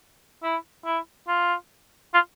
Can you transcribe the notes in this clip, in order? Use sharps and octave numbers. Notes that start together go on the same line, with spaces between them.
E4
E4
F4
F4